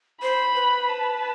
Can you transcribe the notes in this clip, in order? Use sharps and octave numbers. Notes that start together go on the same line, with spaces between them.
C5 B5
B4
A5